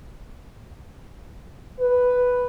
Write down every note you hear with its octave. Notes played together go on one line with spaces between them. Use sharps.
B4